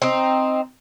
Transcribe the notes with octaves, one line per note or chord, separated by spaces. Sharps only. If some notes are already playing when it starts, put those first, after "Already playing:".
C4 D#4